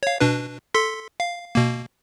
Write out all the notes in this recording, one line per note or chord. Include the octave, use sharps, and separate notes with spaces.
C#5 F5
B2 D4 B4
A4 C6 B6
F5
B2 A#3